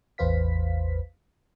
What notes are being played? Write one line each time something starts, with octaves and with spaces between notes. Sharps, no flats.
A1 E2 B4 C5 F5 B6